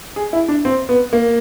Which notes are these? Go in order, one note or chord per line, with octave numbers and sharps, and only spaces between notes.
G#4
E4
D4
C4
B3
A#3